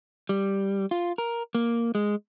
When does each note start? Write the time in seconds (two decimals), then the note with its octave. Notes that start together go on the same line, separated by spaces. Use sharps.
0.29 G3
0.91 F4
1.18 A#4
1.55 A#3
1.95 G#3